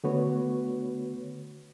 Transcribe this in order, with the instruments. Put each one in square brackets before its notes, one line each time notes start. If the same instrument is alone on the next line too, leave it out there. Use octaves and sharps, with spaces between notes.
[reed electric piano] D3 A3 B3 F#4 B4 C#5